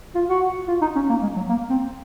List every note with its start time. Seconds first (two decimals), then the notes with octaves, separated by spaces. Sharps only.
0.15 F4
0.29 F#4
0.68 F4
0.82 D#4
0.95 C#4
1.09 A#3
1.22 G#3
1.36 F#3
1.49 A#3
1.70 C4